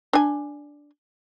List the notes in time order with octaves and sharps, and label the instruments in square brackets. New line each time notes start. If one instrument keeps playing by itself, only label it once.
[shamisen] D4 G#5